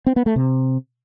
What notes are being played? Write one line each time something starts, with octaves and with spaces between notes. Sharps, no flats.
C4
B3
A3
C3